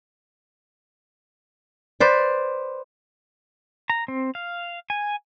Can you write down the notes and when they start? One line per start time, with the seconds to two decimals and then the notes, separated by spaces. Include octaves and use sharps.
2.00 B4 C5 D5
3.90 A#5
4.08 C4
4.35 F5
4.90 G#5